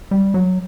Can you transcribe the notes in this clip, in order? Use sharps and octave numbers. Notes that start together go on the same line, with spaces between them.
G3
F#3